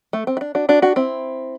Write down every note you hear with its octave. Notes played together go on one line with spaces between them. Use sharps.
A3
C4
E4
D4
D4 F#4
D4 F#4
D4 F#4
C4 E4